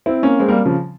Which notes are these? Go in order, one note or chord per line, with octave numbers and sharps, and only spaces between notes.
C4 E4
A#3 C#4
G#3 C4
G3 A#3
C#3 F3